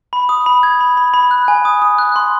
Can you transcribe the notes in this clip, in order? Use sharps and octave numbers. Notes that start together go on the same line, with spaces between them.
B5
D#6
B5
G#6
B5
B5
B5
F#6
G#5
D#6
D#6
F#6
C6